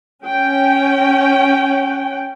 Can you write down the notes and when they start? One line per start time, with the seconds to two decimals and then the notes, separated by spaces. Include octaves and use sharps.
0.24 C#4 G5